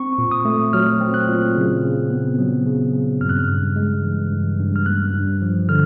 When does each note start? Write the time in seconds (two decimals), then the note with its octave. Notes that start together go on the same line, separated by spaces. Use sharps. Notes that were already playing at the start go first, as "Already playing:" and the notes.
Already playing: C4 C#6
0.18 A#2
0.31 D#6
0.45 A3
0.73 F#3 F6
1.01 C4
1.14 F#6
1.28 A#2
1.57 C#3
1.84 C#3
2.10 B3
2.39 F#3
2.67 C#3
2.93 C#3
3.21 G2 F6
3.29 F#6
3.39 F6
3.49 G2
3.76 G#3
4.04 E3
4.31 G2
4.59 G2
4.76 F6
4.86 A#3 F#6
5.14 G2
5.42 F3
5.69 D3 F6